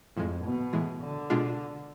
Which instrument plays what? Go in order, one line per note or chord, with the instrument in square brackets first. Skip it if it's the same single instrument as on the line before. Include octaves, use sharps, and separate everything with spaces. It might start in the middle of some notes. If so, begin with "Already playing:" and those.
[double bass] F2 [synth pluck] A2 F3 G#3
[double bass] B2
[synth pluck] A2 E3 G#3
[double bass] D3
[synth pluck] B2 G#3 D4 F4